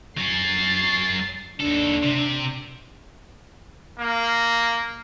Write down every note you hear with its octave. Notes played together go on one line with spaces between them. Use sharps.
F#3 C#4 A6 C7
D#2 D4 A4
C3
A#3